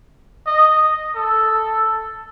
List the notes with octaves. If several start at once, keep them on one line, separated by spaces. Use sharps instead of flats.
D#5
A4